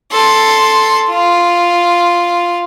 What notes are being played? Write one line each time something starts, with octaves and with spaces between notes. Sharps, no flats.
A4 C6
F4